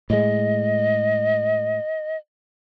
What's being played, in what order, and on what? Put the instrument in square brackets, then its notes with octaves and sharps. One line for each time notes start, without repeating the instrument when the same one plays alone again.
[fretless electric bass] A2 G#3 [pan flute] D#5